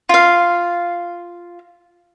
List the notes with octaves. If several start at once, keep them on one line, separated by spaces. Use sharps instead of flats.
F4 F5